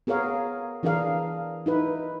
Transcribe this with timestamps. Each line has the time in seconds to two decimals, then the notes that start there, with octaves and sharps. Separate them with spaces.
0.07 B3 G#4 A#4 C#5 F5
0.83 E3 D4 G#4 A#4 F5
1.66 D#4 E4 B4